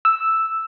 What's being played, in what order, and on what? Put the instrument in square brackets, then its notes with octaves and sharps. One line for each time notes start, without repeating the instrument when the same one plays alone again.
[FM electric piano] E6